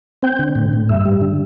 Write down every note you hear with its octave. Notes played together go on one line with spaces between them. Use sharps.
C4 G5
D3
A2
A2
G2 E5
G3
D3